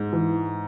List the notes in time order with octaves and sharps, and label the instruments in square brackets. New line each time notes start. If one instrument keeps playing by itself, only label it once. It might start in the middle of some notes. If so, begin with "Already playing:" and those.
Already playing: [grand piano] G#2 [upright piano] G#3
[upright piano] E3